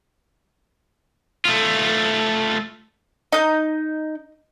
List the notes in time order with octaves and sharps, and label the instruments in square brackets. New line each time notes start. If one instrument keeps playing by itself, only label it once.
[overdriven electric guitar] A3 F4
[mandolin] D#4 G6 [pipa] D#5